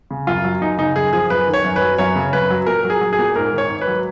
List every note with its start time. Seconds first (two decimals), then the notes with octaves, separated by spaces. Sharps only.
0.10 C#3
0.27 F#2 F4
0.44 F#3
0.61 F#2 D#4
0.79 C#3 D#4
0.96 F#2 G#4
1.13 F3 G#4
1.30 F#2 B4
1.47 D#3
1.54 C#5
1.64 F#2
1.76 B4
1.82 F#3
1.98 F#2 C#5
2.16 C#3
2.33 F#2 B4
2.50 F#3
2.67 A#2 A#4
2.84 F#3
2.90 G#4
3.01 F#3
3.13 G#4
3.19 A#2
3.36 G#2 A#4
3.53 D#3
3.58 C#5
3.70 G#2
3.81 B4
3.87 F#3